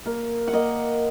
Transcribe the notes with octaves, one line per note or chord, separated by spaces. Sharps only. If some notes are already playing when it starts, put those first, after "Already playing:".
A#3
F#5
A#3 D#5